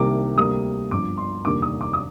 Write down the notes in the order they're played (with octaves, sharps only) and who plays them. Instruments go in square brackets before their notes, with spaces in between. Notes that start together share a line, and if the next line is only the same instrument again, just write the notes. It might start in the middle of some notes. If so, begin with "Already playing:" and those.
Already playing: [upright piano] C2 C3 D#3 G3 A#3 D6
D2 C3 G3 A#3 D#6
G1 G2 F3 D6
C6
F1 D#2 D3 G3 A#3 D6
D#6
D6
D#6